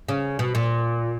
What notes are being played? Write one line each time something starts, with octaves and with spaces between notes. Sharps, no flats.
C#3
B2
A#2